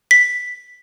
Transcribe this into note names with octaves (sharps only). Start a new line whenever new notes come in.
B6